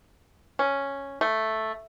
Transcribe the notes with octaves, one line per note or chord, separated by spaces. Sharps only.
C#4
A3